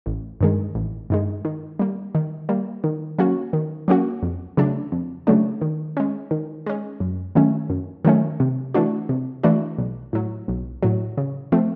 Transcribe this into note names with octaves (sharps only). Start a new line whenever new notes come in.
A1
G2 D#3 G#3
A1
G2 D#3 G#3
D#3
G3 A#3
D#3
G3 A#3
D#3
F#3 A#3 C#4 F#4
D#3
F#3 A#3 C#4 F#4
F2
C#3 F#3 A3 D4
F2
C#3 F#3 A3 D4
D#3
G#3 C#4
D#3
G#3 C#4
F#2
D#3 F#3 A3 C#4
F#2
D#3 F#3 A3 C#4
C3
E3 A3 D4 F#4
C3
E3 A3 D4 F#4
B1
A2 F#3
B1
A2 F#3
C#3
F3 A3 C4